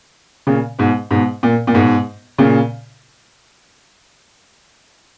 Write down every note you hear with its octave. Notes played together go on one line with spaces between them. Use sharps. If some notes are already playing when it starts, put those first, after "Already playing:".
A#2 C#3
G#2 B2
G#2 B2
A#2
A#2
G#2 B2
A#2 C#3